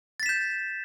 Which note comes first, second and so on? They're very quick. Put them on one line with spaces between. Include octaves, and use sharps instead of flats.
A6 B6 E7 G6